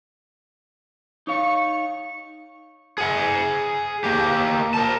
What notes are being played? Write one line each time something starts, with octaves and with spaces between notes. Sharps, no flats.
D#4 C#5 F5 C#6
G#4 F#5
A#3 G4
A#4 A5